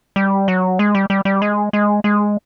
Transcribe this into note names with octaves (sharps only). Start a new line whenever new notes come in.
G3
F#3
G#3
G3
G3
G3
G#3
G#3
G#3